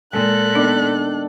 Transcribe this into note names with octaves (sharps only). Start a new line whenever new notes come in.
A#2 G#3 A4 F#6
D#3 B3 D4